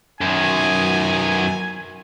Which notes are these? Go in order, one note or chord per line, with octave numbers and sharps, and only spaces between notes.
F#2 D#3 G#5